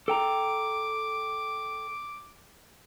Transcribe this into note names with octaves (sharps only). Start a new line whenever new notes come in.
A4 G5 A#5 D6